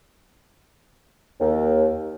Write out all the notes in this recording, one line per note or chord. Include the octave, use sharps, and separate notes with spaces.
D#2